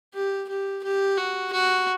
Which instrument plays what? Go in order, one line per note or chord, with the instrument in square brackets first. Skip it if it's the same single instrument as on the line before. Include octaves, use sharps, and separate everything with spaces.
[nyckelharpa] G4
G4
G4
F#4
F#4